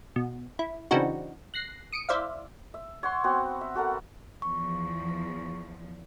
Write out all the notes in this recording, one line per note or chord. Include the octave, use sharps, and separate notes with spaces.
B2
E4
C#3 E3 C4 D4 D#4 F#4
F#6 A#6 C7
D#6 C#7 D7
E4 C5 D5 E5 F5
E5
C#5 F#5 C6
B3 C4 F#4
E5
F#4 A4 A#4 F#5
E2 F3 C#6